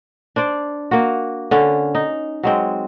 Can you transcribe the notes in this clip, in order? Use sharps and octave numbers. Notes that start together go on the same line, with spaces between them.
D4 C5 D5
A#3 F#4
D3 C#4
D#4
F#3 G#3 C4